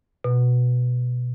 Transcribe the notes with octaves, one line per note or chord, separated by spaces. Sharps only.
B2